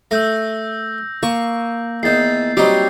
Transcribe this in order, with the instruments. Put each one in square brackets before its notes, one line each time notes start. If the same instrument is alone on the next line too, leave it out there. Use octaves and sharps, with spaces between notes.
[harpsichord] A3 [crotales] E6 G6 A#6
[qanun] A#3 [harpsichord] C#6
[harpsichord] E2 D#3 [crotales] G6 A6 C7
[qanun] F#3 G4 [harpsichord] G3 C4 D#4